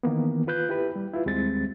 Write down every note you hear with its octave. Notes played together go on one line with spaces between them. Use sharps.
D#3 E3 A#3 B3
F4 B4 F#6 G6
E4 G4 B4
G3
E4 F4 B4
D#2 G3 G#3 C4 A6